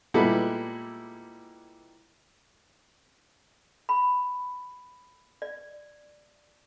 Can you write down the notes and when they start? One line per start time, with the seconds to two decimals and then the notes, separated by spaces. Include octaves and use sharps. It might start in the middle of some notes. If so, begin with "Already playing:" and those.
0.14 A#2 G3 G#3 B3 E4 A4
3.89 B5
5.42 D5